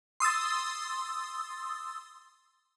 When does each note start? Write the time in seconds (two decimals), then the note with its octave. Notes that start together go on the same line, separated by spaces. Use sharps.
0.20 C6 D#6 E6 A6